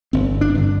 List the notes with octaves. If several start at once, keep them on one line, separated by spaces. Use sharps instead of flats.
G1 C4
D4
G2 D3